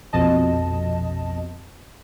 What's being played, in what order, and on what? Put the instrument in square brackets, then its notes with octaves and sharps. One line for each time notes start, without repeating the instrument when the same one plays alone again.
[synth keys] A#1 F2 B2 D#5 A5